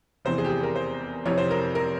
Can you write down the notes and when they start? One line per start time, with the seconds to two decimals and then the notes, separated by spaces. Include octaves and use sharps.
0.25 F1 E2 C3 E3 C5
0.38 G#4
0.45 G4
0.50 G#4
0.63 A#4
0.76 C5
1.25 F1 F2 C3 E3 C#5
1.38 C5
1.51 A#4
1.75 A#4